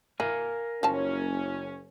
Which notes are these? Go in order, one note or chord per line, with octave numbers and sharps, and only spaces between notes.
E4 A#4 F5 G#5
F#1 F3 C#4 A5